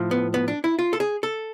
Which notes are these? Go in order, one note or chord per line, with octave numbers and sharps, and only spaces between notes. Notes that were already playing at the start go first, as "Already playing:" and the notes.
Already playing: A2 F3
B3
B3
D4
E4
F4
A4
G#4
A4